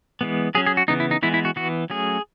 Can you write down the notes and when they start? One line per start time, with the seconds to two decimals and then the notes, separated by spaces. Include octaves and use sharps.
0.21 E3 G#3 B3
0.55 F#3 C#4 G#4
0.66 G#4
0.77 F#4
0.88 C#3 E3 B3 D#4
1.00 E4
1.11 D#4
1.23 E3 G#3 B3 E4
1.34 E4
1.45 F#4
1.56 E3 B3 F#4
1.90 F#3 A3 C#4 G#4